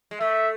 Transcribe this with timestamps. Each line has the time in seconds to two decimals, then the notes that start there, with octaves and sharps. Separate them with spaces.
0.11 G#3
0.21 A3 E5